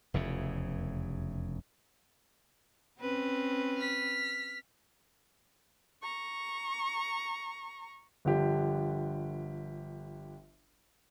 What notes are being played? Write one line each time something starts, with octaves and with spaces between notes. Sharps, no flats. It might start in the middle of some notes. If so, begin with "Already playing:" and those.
F1 E2 C#3
C4 C#4 B4
F6 B6
A#5 C#6
G1 D3 F3 G4